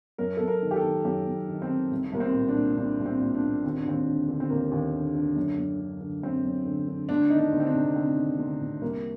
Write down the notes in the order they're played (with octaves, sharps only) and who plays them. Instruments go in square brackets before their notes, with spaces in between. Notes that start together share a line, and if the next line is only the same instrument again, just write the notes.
[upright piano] F#2 A#4
F#2 A4
A#4
D#3
G4
A4
D#3
F#2 G4
F#2
D#3
C4
D#3
C2
C2 A#3
C4
A#2
D4
A#2
C2 D4
C2
C4
A#2
D4
A#2
D#2 C4
D4
D#2 C4
D3
D3
C4
D#2 A#3
D#2
D3
D3
F#2
F#2
D3
D3
F#2 C4
F#2
D3
D3
D2 D4
D#3 D#4
D4
D2
C4
D4
C3
D2 C4
D#3
D2
C3
C2 A#3